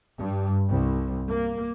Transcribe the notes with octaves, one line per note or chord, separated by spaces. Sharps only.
G2
C2
A#3